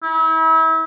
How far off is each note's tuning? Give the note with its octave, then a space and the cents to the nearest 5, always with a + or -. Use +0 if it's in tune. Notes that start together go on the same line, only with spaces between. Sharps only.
E4 -35